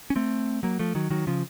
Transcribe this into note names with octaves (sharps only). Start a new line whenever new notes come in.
C#4
A3 C4
F#3 A#3
F3 A3
D#3 F#3
D#3 F#3
C#3 F3